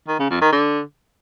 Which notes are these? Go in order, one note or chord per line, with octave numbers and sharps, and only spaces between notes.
D#3
C#3
F2
D#3
D3